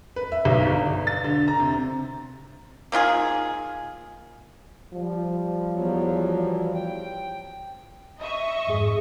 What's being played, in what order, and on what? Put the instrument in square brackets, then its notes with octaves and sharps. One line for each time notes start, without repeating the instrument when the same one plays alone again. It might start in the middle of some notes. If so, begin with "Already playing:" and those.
[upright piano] B4
E5
B1
G1
A6
D3
A#5
C3
[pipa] A#3 D#4 F4 G#4
[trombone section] F3 G3
[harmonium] E2 F#3
G5
[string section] D#5 E5 C#6
[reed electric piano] F2 G#2 G#4